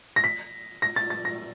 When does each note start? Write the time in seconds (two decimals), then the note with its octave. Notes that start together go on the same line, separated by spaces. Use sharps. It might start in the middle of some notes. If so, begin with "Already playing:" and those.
0.16 A#6
0.24 B6
0.82 A#6
0.96 A6
1.10 A6
1.25 A#6